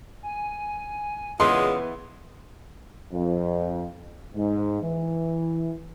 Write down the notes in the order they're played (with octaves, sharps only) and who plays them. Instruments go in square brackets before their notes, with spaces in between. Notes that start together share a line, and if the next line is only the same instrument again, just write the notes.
[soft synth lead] G#5
[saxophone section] A#2 C#3 G#3 [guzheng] E3 B3 [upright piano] C6
[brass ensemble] F2
G#2
E3